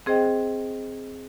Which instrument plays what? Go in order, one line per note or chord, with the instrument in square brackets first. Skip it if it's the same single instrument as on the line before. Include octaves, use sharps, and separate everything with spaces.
[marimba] C4 G#4 C5 D#5 G5